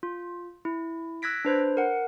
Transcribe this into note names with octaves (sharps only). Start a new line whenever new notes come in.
F4
E4
E6 F#6 G#6 A#6 B6 D7
D4 B4 C5
A#4 F#5